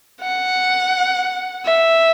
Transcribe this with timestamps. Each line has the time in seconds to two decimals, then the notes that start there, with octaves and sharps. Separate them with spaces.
0.21 F#5
1.65 E5